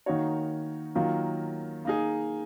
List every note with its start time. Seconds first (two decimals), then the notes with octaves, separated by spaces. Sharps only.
0.06 D#3 A#3 D#4 F#4 C#5
0.95 D#3 F#3 A#3 F4
1.85 A#3 D#4 G#4